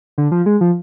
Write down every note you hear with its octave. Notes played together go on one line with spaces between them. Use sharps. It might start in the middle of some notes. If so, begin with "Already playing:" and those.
D3
F3
G#3
F3